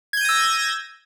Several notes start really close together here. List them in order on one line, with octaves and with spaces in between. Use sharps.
G#6 G6 D#7 A#6 E6